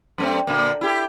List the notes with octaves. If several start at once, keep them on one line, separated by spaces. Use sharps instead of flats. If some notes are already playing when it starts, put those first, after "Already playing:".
F#2 A3 C4
A#2 D3 A#3
E4 G4 A4